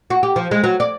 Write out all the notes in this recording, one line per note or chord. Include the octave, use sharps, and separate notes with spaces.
F#4
G4
F3
G#3
F#3
D5